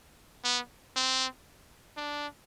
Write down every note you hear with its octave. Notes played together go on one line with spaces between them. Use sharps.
B3
C4
D4